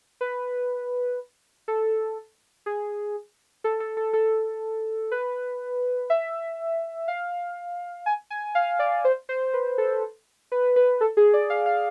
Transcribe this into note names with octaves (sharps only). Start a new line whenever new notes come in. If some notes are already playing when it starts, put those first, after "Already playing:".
B4
A4
G#4
A4
A4
A4
A4
B4
E5
F5
G#5
G#5
F5
D5
C5
C5
B4
A4
B4
B4
A4
G#4
D5
F5
F5